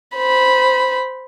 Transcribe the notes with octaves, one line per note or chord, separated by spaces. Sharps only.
C5 B5